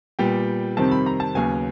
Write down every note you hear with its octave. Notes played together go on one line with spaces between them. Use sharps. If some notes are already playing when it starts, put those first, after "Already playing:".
A#2 G3 B3 G5
F2 C3 D#3 G3 C4 A5
B5
A#5
A5
D#2 C#3 F#3 B3 G#5